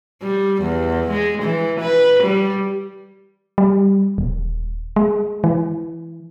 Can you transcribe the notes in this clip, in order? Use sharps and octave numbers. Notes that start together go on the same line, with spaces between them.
G3
E2
G#3
E3
B4
G3
G3
D#1
G#3
E3